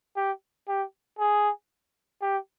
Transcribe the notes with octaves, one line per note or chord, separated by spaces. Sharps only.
G4
G4
G#4
G4